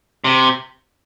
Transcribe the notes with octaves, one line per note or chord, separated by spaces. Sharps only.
C3